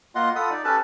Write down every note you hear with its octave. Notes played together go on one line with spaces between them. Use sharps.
A#3 F4 D#5 F#5 C6
F4 A4 F#5 B5 D#6
D#4 D5
C#4 G4 A4 B4 A5 B5